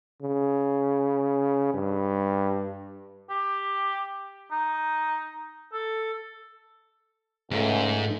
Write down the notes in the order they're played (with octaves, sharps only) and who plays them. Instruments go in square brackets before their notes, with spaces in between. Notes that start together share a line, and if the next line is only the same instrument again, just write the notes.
[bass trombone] C#3
G2
[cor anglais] G4
D#4
A4
[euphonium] C#2 [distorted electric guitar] G#2 [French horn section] A3